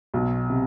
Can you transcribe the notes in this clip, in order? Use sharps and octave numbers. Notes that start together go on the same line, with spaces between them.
B1 B2
C3